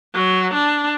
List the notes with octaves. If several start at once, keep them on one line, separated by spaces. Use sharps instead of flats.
F#3
D4